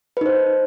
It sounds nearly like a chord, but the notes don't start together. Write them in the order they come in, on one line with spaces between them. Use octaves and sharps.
B4 D#4 C5